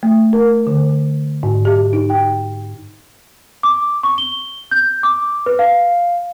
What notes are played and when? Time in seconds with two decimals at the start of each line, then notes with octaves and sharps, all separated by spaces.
0.03 A3
0.33 A#4
0.67 D3
1.43 G#2
1.65 G4
1.93 D#4
2.10 G5
3.63 D6
4.03 C#6
4.18 G7
4.71 G6
5.03 D6
5.46 B4
5.59 F5